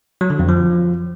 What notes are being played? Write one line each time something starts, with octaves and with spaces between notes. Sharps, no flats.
F#3
D3
F2
F3